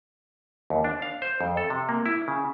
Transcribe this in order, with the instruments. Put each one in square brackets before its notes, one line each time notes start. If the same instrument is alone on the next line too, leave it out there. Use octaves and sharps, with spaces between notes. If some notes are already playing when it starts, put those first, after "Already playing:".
[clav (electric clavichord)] D#2
D4
F5
C5
F2
A4
C3
A#3
E4
C#3